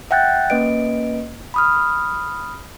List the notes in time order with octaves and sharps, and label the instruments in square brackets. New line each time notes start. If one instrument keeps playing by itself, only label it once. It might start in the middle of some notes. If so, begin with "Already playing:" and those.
[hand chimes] E5 F#5 G5 F#6 G6 A6
A#3 C#4 B4 D#5 D7
B5 D#6 F6